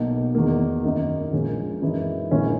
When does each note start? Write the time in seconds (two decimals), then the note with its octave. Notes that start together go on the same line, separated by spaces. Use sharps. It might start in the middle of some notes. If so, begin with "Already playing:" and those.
Already playing: B1 B2 A#3
0.35 E2 D#3 A#3
0.84 F#2 D#3 A#3 D#4
1.33 A#1 A#2 G#3 C#4
1.82 F#2 E3 G#3 D#4
2.31 A#1 A#2 G#3 C#4 E4